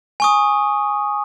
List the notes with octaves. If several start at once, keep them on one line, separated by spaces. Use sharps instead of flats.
G#5 C#6 D#6